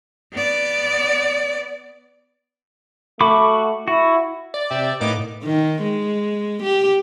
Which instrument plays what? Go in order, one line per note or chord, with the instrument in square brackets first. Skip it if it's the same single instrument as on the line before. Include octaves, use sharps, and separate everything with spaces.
[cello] B3 D5
[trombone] A3 [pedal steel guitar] F#4 B5 D6
[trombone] E4 [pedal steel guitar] F#4
[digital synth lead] D5
[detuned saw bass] C3 [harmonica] E5 G5
[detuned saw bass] A2 [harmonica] A#3 B3 D#4 [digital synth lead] D6
[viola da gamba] D#3
G#3
G4